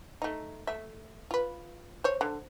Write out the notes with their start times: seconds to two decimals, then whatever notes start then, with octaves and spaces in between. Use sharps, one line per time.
0.22 A3 D#4
0.67 A3 E5
1.31 F4 B4
2.04 C5 C#5
2.21 D3